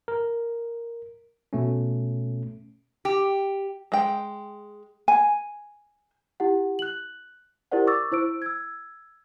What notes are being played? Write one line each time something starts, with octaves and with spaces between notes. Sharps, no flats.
A#4
B2 A3 C#4
G4
G#3 G5
G#5
E4 G4 F#5
F#6 F#7
E4 G4 A#4 C5 D5 F#5
C#6 D6 E6 A6
E4 C5 E6 D7
E6 G#6